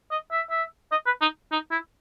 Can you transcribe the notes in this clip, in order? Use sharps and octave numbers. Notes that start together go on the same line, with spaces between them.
D#5
E5
E5
D#5
B4
D#4
D#4
E4